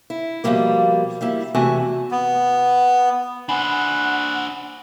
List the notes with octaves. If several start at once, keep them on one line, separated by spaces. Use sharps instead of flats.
E4
B2 E3 F3 G3 A#3
G3 A#3 E4
E2 C3 A3 F#4 G#5 A5
B3
D4 C5 F#5 G#5 B5